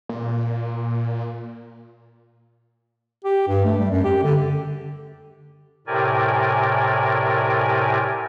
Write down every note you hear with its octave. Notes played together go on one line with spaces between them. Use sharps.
A#2
G4
G2
A3
G3
F#2
G4
D3
A2 C3 G4 A#4 D5 G#5